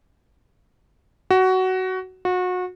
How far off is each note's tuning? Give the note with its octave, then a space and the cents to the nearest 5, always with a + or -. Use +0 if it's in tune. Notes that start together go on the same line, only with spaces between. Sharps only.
F#4 +15
F#4 -30